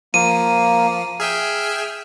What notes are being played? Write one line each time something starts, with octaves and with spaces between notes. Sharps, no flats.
F3 A#3 D#7
G#4 E5 G5 F6